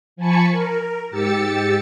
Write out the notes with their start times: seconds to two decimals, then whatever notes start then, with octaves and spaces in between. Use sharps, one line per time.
0.16 F3 G#5 A5 B5 C#6 C#7
0.51 A#4
1.10 G#2 G4 E6 A6 C#7